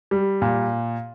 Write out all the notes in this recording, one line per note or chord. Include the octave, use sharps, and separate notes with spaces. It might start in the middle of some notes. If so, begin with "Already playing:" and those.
G3
A#2